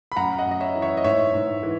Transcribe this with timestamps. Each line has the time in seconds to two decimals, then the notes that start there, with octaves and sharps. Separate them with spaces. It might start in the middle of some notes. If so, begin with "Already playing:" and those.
0.12 B5
0.16 F#2 F#5 A#5
0.38 D#5 F#5
0.46 F#2
0.51 D#5
0.61 C#5 E5
0.75 E3
0.82 C#5 E5
0.97 D#5
1.04 G#2 C#5 E5
1.34 G#2
1.63 E3